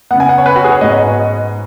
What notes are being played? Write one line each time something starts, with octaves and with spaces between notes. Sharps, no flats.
C#3 B3 F#5
G#5
F#5
C#5
B4
F#4
G#4
C#5
G#2 G#3 B3 D#5
D#5